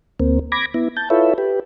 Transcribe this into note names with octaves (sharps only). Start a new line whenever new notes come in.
D2 A#3 C4
B5 D6 G#6 A#6
B3 E4
A5 G6
E4 F4 A4 B4 C#5 E5
G4 B4